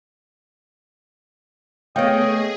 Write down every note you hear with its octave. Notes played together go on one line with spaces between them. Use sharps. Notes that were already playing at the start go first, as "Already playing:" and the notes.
A3 B3 G#4 C#5 D#5 F5 G5